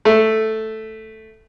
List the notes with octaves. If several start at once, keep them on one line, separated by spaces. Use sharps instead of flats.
A3